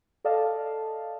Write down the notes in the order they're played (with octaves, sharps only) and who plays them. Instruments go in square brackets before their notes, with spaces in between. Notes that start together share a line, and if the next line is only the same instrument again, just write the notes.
[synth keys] A4 D5 D#5 F5 A5